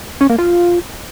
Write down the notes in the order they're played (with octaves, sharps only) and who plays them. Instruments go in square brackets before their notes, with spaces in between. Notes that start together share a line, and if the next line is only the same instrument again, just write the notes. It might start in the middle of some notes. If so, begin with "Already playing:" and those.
[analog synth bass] C#4
A#3
F4